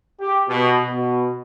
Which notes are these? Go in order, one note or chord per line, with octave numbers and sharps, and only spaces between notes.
G4
B2
B2